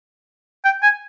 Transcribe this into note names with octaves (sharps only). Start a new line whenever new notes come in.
G5
G#5